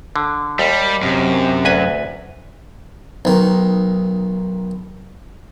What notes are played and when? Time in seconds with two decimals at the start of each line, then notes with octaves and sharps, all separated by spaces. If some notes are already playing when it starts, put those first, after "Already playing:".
0.16 D3
0.59 D#2 G3
1.02 F#2 C3
1.65 D2 B4 G#5
3.25 B1 D#3